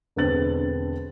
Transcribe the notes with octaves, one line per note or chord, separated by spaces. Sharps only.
E1 D3 B3 C4 A6 F#7